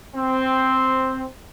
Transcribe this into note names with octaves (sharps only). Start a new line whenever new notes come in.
C4